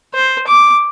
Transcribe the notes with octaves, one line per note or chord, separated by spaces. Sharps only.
C5
D6